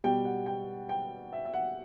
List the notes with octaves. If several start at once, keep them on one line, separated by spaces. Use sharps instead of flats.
B2 G3 G5
F#5
G5
G5
E5
E5
F#5